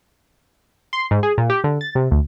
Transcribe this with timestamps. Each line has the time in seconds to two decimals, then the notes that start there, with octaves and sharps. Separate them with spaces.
0.93 C6
1.11 G#2
1.23 G#4
1.38 A#2
1.50 G4
1.64 D3
1.81 A6
1.95 C3
2.11 D2